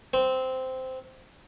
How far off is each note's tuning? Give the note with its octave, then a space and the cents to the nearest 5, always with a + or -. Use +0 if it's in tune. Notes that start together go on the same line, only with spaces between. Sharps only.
C4 -10